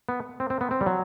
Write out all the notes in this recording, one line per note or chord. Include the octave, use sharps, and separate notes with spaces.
B3
C4
C4
B3
C4
G3
F#3